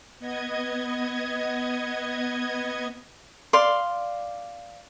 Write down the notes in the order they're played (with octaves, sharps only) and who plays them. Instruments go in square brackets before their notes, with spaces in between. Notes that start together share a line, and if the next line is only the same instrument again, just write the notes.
[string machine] B3 D#5 G#6
[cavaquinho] D5 F5 C6